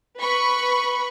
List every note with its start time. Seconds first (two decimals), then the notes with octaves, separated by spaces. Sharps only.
0.20 B4 B5 C#6